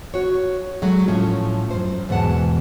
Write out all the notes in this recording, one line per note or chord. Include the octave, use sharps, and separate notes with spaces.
F#4 C#5
F#3 G#3 A3 F#4
A2 F3 C#4
F#2 C5
E2 G#2 B2 F#5 A5